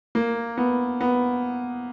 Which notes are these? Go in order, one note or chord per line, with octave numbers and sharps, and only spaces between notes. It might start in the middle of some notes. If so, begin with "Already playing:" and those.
A#3
B3
B3